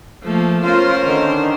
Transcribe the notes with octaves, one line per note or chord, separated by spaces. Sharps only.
F3 A3 A#3
C#4 F4 A#4 C5
D3 D#3